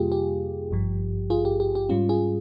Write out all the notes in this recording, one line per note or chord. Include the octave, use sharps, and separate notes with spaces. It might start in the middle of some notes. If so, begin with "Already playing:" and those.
Already playing: F2 C3 G3 A#3 F4 G4 G#4
G4
G#1 G2 F3
F4 G#4
G4
G4
G4
G#2 G3 C#4 F4
F4 G#4